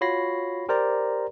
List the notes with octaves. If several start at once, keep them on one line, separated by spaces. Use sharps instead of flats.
F4 F#4 C#5 B5 A#6 C7
G4 A#4 C5 D5 A#5